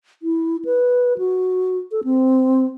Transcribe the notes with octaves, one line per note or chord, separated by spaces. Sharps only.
E4
B4
F#4
A4
C4